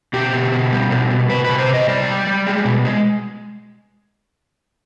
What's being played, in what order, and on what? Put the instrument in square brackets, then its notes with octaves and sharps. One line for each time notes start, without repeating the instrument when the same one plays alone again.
[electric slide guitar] B2 G4
B2
B2
G3
B2
B2
C3 B4
C3 B4
C5
C3
D#5
G3 D5
G3
G3
G#3
B2
G#3